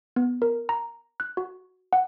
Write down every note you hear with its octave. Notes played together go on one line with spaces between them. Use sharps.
B3
A#4
A#5
F#6
F#4
F#5